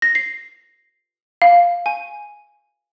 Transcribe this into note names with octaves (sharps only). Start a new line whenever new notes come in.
A#6
C7
F5
G#5